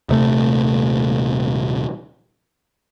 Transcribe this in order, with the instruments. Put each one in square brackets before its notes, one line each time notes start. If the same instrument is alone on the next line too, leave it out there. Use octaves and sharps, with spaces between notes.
[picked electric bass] D#1 C3 A3